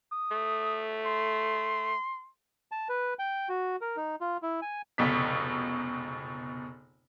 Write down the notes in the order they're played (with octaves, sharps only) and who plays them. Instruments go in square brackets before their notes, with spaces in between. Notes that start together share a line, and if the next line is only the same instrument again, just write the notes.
[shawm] D#6
[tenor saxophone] A3
[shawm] C6
[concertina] A5
B4
G5
F#4
A#4
D#4
F4
E4
G#5
[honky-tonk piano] F1 C#2 B2 B6